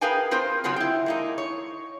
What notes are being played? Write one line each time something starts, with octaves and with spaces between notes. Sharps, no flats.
G#4 A#4 B4 F5 G5 G#5
C4 F4 A#4 C5
C#3 F#3 C4 F4 F#4 G#4
E4 G5
G#3 A#3 D#4
C#5